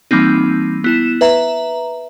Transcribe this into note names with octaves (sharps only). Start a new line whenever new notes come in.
E3 G3 A#3 C4 D#4
B3 E4 E7
B4 E5 A#5